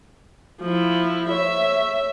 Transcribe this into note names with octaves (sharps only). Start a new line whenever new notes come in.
F3 E4
C#5 E5